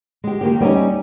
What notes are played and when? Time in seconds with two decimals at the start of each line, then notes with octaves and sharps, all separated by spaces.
0.24 G#3 G4
0.41 D#3 A#3 G4
0.61 G3 B3 C#4 D#4